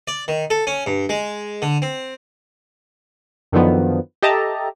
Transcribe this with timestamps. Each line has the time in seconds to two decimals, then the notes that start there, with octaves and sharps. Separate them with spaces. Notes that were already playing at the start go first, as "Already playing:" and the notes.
0.08 D5
0.28 D#3
0.50 A4
0.67 C#4
0.86 G2
1.09 G#3
1.62 D3
1.82 C4
3.52 F#2 D3 D#3 F3 B3
4.22 G4 A4 D#5 E5 A5 A#5